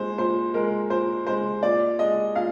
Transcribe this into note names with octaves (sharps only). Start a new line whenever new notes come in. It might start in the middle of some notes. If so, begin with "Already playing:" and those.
Already playing: A#2 G#3 C5
A#2 C5
G#3 A#4
A#2 C5
G#3 C5
A#2 D5
G#3 D#5
A#2 F5